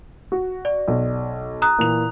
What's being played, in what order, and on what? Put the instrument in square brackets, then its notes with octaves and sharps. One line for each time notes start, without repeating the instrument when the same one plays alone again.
[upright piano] F#4
[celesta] D5
[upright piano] B1
[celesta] A#5 D#6 F#6
[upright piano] A#2 E3 F7